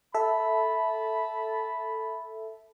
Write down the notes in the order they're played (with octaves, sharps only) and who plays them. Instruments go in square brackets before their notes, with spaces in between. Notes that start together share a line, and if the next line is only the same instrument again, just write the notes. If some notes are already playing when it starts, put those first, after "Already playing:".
[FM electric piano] A4 E5 [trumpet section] A5 B5